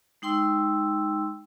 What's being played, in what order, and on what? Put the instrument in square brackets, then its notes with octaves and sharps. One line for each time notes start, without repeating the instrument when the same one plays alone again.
[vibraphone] G#3 D#4 G5 C6 E6